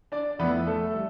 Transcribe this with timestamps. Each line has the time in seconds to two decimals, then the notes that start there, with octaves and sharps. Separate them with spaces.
0.12 D4 D5
0.39 F2 E3 A3 B3 B4
0.67 A3 A4
0.93 G3